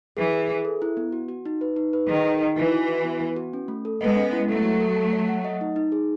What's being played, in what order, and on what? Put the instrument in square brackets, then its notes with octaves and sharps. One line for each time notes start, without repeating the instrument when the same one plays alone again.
[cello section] E3 [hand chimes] G#4
[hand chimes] G#4
G#4
A4
E4
B3
F#4
F#4
D#4
B4
D#4
B4
[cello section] D#3 [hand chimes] G#4
[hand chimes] D#4
D#4
[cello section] E3 [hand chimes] F#4
[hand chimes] F#4
F#4
B3
B3
F#4
C#4
A3
A4
[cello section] G#3 B3 [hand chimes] D#5
[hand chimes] C#4
E4
[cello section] F#3 A3 [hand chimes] A4
[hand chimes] F#4
A4
A5
C#5
F#5
D#5
D#4
D#4
G#4